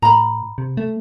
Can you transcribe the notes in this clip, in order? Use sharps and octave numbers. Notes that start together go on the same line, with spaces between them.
A2 A#5 B5
C3
A3